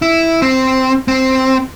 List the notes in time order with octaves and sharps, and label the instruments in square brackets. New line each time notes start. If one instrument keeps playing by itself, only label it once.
[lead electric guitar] E4
C4
C4